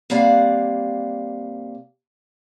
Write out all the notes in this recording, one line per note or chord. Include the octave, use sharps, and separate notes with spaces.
C3 G3 A#3 D5 F5 F#5